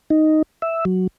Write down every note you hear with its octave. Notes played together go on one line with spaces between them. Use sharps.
D#4
E5
F#3